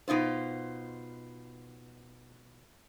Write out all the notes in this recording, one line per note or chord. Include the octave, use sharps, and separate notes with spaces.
B2 D#4 F4 C5